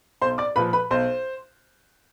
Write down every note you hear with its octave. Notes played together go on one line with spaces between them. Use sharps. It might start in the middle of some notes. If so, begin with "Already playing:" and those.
B1 C5 C6
D5 D6
A#2 F3 B4 B5
B4 B5
B1 C5 C6